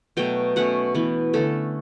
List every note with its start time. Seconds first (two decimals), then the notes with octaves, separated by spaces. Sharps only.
0.17 B2 F#3 A3 G5
0.56 B2 A3 C#4 F#5
0.94 E3 B3
1.33 D3 A3 C#4 A4